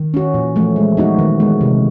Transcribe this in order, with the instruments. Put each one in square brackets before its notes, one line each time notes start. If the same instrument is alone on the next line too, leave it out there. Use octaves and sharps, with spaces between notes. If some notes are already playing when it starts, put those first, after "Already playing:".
Already playing: [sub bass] D#3
[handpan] C#4 F#4
[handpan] A#2 [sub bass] E3
[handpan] F3 A3
G#3
B3 D#4 F#4
[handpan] D#3 [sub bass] E3
[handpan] G#3 B3
C3